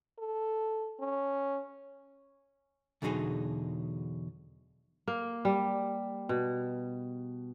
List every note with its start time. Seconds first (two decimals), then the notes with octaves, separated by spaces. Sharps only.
0.19 A4
1.00 C#4
3.02 E2 B2 D3 F#3 D#4 G#4
5.08 A#3
5.45 G3
6.29 B2